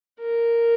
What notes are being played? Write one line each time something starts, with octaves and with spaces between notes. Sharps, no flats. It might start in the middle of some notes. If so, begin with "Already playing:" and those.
A#4